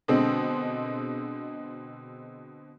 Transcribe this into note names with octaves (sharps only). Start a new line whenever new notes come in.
B2 D3 G#3 C4